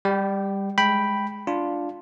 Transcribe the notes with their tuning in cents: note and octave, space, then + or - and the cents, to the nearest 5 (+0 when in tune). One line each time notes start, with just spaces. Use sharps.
G3 +15 G5 -20
G#3 +0 G5 +0 B5 +0
D4 +0 F4 +0